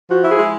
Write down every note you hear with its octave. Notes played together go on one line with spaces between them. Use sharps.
F3 F#4
E4
G#4
G#3